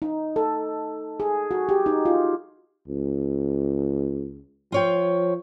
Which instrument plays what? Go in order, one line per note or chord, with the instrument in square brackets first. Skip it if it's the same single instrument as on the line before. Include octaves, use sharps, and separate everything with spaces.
[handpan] D#4
A4
G#4
F#4
G4
D#4
F4
[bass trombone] C#2
[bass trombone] F3 [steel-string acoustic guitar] F4 C#5 G5